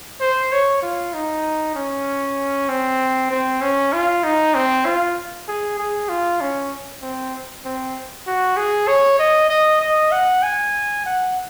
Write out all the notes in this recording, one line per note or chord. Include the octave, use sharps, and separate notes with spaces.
C5
C#5
F4
D#4
C#4
C4
C4
C#4
F4
D#4
C4
F4
G#4
G#4
F4
C#4
C4
C4
F#4
G#4
C#5
D#5
D#5
D#5
F#5
G#5
F#5